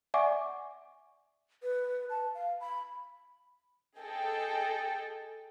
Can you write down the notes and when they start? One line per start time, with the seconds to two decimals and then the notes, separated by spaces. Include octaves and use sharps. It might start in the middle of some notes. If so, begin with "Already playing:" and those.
0.14 D5 E5 F#5 G#5 C#6 D6
1.63 B4
2.10 A5
2.35 F5
2.61 B5
3.99 G#4 A4 D#5 G5